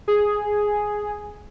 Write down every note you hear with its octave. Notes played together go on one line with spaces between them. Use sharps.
G#4